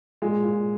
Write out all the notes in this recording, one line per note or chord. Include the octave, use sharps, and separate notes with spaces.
A#2 G#3
A#2